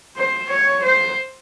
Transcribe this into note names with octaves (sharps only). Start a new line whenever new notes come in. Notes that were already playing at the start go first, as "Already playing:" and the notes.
C5
C#5
C5